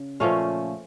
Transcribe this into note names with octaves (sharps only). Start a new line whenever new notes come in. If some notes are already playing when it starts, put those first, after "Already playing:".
Already playing: C#3
A#2 F3 A3 C#4 F5